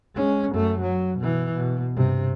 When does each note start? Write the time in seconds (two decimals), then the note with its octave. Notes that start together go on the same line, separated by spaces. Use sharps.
0.16 G#3 C#4
0.52 F#2 A3
0.81 F#3
1.18 B2 E3
1.54 B2
1.94 G2 C3